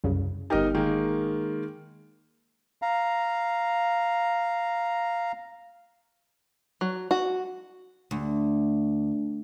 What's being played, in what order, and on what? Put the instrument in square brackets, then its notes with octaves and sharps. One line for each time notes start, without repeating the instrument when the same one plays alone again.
[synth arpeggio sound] C2 F#2 C#3
[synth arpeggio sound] G1 G4 [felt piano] D#4 A#4 D#5
[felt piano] D#3 G#3 A#3
[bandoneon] F5 A#5
[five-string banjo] F#3
F#4
[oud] D2